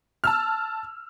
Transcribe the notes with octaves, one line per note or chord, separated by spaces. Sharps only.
A5 E6 F6